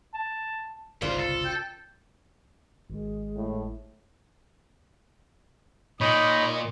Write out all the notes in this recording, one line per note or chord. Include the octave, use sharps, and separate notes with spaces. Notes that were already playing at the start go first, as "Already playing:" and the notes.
A5
G1 C2 G#2 C#3 F4 B4 C5 D5
A4
G5
G#1 G#3
A2
A#2 D#4 C#5 D#5 B5